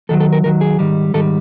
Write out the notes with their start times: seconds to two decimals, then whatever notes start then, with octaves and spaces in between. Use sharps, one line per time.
0.09 D#2 D#3 F#3 A4
0.20 A4
0.33 A#4
0.44 D#2 D#3 F#3 A#4
0.61 G#4
0.79 G#2 D#3 G3
1.14 G#2 D#3 G3 A4